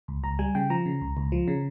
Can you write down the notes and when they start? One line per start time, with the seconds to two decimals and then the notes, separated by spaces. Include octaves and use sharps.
0.08 C#2
0.24 C#2 A#5
0.39 G3 G#5
0.55 C#3 G5
0.70 F3 A#5
0.86 C#3
1.02 C#2
1.17 C#2
1.32 F3
1.48 C#3